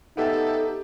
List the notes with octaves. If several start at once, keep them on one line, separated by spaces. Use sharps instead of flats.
B3 D#4 G4 A4 E5